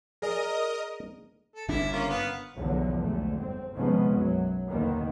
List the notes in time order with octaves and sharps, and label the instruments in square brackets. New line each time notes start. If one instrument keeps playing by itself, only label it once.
[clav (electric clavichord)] G#4 D5 [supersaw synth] A#4 D#5 D#6
[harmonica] A4
[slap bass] G1 C#3 D4 [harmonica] E4
[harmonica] A#3 C#4 F4
B3 F5
[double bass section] B1 E2 G2 D3 F3 F#3
B1 G#2 D3 A3
G1 C4
C3 D#3 F3 G#3 B3 C#4
B1 F#2 F#3
A1 D#2 D3 D#3 A#3 B3